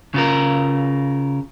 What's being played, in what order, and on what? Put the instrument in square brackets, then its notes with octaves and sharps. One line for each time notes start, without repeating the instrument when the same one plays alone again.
[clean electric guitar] C#3 F4 A#4